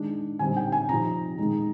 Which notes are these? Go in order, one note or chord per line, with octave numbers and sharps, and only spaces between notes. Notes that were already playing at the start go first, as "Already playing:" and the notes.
Already playing: D#3 G#3 D4
D3 G3 C4 D#4 G#5
G5
G#5
C3 F3 C4 D#4 A#5
D#3 G#3 D#4